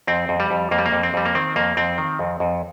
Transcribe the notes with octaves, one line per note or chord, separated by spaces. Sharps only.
F2 C4
F2
G3
F2
F2 A#3
G3
A#3
F2
C4
F2 G3
A#3
D#3 C4
F2 A#3
F2 C4
D#3
F2
F2